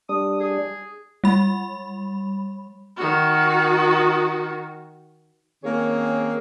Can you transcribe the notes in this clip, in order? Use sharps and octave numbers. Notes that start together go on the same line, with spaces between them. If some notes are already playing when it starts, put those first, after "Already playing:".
G3 D4 D#6
G#4
G3 B5
D#3 F#4
D#3 A#3 C4 C#4 G#4 C#5